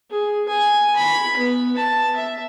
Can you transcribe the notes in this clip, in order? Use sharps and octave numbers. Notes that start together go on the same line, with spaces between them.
G#4
G#5
B5
B3
A5
E5